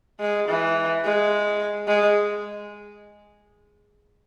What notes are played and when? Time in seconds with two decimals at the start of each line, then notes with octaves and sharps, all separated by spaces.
0.20 G#3
0.48 E3
1.05 G#3
1.88 G#3